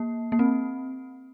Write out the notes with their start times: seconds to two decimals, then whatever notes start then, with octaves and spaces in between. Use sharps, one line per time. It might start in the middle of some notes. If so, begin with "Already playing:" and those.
Already playing: A#3
0.32 A#3
0.39 C4